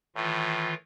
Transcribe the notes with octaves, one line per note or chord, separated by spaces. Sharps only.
A2 D#3 E3 F4